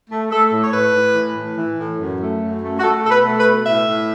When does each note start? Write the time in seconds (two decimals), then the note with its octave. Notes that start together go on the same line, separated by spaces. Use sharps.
0.10 A3
0.31 A3 A4
0.51 A2
0.63 C#5
0.72 A2 B4
0.93 A2
1.15 E3
1.36 A2
1.57 E3
1.78 A2
1.99 F#2
2.20 A3
2.41 F#2
2.62 A3
2.79 F#4
2.83 A3 A4
3.04 B2 A4
3.10 B4
3.25 A3
3.39 B4
3.46 B2
3.66 A2 E5
3.88 A2